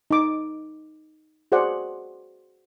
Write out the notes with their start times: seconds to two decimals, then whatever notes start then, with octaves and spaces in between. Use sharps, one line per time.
0.11 D#4 D6
1.52 F#4 G#4 C5 D5 F#5